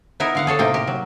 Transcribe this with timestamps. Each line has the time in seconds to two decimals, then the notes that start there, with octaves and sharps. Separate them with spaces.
0.20 B3 D#4 E4 A#4 E5
0.35 D3 F5 F#5
0.47 G#4 A4 C#5 A5
0.59 A2 C3 A#3 D#4 G5
0.74 G4 A#4
0.87 F#3